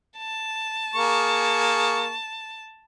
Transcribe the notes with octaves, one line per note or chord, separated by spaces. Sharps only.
A5
A#3 G#4 C#6